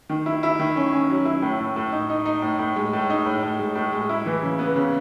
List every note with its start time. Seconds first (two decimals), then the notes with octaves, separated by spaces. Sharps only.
0.10 D#3
0.26 E4
0.43 E4
0.59 D#3
0.76 C#4
0.93 C#4
1.10 F#3
1.25 E4
1.42 A2
1.60 A2
1.76 A2
1.92 D#4
2.10 D#4
2.26 D#4
2.42 A2
2.59 A2
2.76 G#3
2.93 A2
3.10 D#4
3.26 A2
3.43 A2
3.59 G#3
3.75 A2
3.92 G#3
4.09 E4
4.26 E3
4.43 C#3
4.59 B3
4.75 C#3